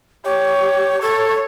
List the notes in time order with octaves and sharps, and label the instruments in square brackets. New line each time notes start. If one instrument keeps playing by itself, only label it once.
[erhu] G4 [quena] C#5
[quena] A4 [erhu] C#5